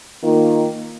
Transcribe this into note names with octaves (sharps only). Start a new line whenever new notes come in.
D#3 A#3 F4